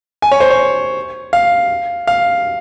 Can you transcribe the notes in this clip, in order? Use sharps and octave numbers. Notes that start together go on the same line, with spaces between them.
G#5
C#5
C5
C#5
F5
F5